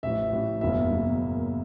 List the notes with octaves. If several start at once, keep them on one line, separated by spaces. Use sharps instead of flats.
A1 A2 F3 E5
A1 A2 F3
F#1 E2 B2 F#3 A#3 E5
F#1 E2 B2 F#3 A#3